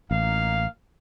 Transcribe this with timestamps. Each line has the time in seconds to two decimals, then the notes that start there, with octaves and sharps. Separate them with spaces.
0.11 A1 A#3 D#4 F5